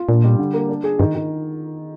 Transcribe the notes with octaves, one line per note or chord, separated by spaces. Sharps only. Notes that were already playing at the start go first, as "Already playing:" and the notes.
Already playing: F4
A#2 D4
G3
D3
A#3
D4
G#4
G2 D#3
D#3